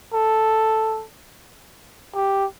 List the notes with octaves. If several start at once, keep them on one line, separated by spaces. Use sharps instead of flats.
A4
G4